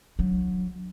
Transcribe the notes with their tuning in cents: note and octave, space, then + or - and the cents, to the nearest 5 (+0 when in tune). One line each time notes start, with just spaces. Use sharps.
F#3 -20 D4 +0